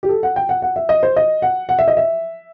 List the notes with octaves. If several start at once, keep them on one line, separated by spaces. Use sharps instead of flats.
G4
A4
F#5
G5
F#5
F#5
E5
D#5
C5
D#5
F#5
F#5
E5
D#5
E5